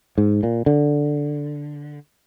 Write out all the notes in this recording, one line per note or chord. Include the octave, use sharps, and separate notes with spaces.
G#2
A#2
D3